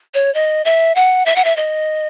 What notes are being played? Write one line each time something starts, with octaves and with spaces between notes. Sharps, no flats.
C#5
D#5
E5
F#5
E5
F#5
E5
D#5